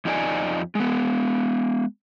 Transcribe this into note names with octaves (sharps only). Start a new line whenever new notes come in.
F2 F3 D#4 F#4 D5 G#5
G#3 B3